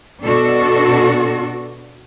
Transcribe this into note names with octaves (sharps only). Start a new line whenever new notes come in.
B2 D4 F#4 A4